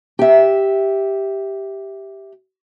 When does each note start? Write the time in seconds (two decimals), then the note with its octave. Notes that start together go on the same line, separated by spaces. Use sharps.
0.19 G4 E5